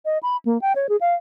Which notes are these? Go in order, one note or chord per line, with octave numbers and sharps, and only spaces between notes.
D#5
B5
A#3
G5
C#5
G#4
F5